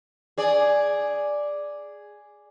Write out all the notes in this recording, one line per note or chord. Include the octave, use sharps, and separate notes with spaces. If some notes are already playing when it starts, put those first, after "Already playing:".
G#4 D5